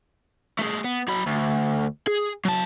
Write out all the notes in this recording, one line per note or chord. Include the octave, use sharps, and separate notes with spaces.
A3 G#4
B3
F#3 B5
D2
G#4
F#3 A5